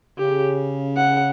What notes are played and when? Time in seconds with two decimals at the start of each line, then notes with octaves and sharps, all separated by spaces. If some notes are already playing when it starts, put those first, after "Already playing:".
0.18 C#3 G4
0.97 F#5